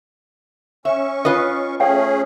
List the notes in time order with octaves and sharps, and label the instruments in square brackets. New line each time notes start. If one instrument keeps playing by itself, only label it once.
[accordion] C#4 C#6 [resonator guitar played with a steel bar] E5
[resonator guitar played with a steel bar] F4 B4 D#5
[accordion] A3 C#4 G#4 [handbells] C#5 F5 G5